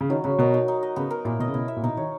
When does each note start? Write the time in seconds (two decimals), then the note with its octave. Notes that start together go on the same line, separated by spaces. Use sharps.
0.01 C#3
0.10 D#3 F#3
0.24 C#3 F#4
0.39 B2 A#4
0.54 D#4
0.68 D#4
0.83 D#5
0.96 C#3 B3
1.11 A#4
1.25 A#2 E4
1.39 B2 D#5
1.48 C#3
1.54 B2 E4
1.68 E5
1.76 A#2
1.83 B2 D#4
1.97 D#3 C#5